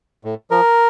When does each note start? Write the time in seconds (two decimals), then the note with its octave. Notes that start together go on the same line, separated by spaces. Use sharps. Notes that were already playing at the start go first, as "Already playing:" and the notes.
0.25 A2
0.51 F3 A#4